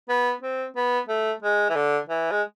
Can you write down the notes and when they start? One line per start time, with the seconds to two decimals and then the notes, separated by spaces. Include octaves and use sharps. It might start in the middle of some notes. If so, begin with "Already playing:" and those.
0.09 B3
0.43 C4
0.76 B3
1.09 A3
1.42 G#3
1.69 E3
1.75 D3
2.09 E3
2.31 G#3